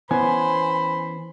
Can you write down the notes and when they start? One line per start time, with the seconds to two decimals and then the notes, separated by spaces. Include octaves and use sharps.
0.11 E3 B3 C#4 C5 G#5 B5